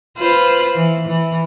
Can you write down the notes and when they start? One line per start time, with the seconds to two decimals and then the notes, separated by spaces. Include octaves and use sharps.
0.18 F4 B4 C5
0.75 E3
1.07 E3